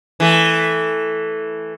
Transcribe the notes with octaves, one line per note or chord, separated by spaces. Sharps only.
E3 A3